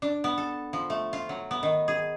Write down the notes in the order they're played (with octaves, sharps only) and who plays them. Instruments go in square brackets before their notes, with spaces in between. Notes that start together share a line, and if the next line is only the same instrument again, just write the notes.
[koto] D4
B3
A4
F3
A3
F4
F#3
B3
D#3
G#4